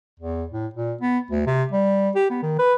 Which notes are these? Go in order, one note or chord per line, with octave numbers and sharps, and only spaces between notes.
E2
A2
A#2
B3
D2
C3
G3
G4
B3
D#3
B4